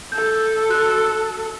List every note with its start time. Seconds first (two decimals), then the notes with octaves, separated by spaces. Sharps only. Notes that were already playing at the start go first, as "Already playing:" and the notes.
0.12 A4 G6
0.69 F#4 F#6